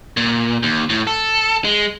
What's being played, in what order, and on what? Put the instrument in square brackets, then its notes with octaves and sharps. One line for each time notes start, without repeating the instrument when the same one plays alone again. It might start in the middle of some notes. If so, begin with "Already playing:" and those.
[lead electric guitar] A#2
D#2
A2
A4
G#3